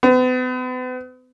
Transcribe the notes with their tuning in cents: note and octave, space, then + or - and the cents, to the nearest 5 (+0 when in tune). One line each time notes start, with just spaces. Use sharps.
B3 +40